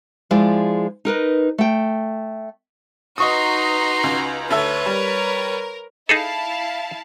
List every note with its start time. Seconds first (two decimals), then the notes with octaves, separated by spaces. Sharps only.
0.31 F3 G#3 E4 G#4 D5
1.05 D#4 A#4 B4 D#5
1.58 A3 G5
3.18 D#4 F#4 B4 D#5 A#5 C6 C#6 D#6
4.04 C#2
4.50 D2 A4 B4 C#5 E5
4.86 G3 A#4
6.09 D#4 E4 G#4 A4 F5 A5